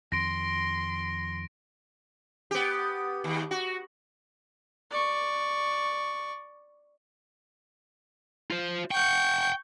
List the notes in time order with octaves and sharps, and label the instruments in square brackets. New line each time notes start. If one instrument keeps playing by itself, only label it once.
[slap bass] F2 D#3 [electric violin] C6 [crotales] A#6 D7
[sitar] B3 G4
D#2
F#4
[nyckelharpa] D5 C#6
[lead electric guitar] F4 C5
[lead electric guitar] F#5 G5 [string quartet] C#6 G6